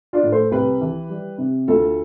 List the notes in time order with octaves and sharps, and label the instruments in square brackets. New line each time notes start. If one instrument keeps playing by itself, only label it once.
[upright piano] D4 F4
A2
A4 C5
C2 G4 B4
E3
G3
C3
D2 F4 A4